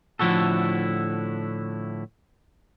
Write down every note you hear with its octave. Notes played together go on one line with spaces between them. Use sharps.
A2 D3 F3 E4 F#4 A4